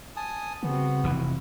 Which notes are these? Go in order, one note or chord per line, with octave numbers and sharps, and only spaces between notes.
G#5 A5 D#6
C#3 G3 B3 C4 F#4
F1 E3